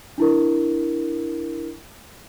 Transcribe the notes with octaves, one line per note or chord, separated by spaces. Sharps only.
D4 E4 A#4